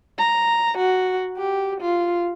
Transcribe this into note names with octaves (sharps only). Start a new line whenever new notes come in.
A#5
F#4
G4
F4